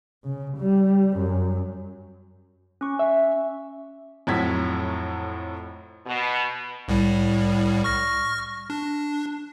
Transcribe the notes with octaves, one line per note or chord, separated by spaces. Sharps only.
C#3
G3
F#2
C#4 C#6
E5
F2 A2 F#3 G#6 B6
B2
C2 A2 G3
C#6 F6 A#6
D4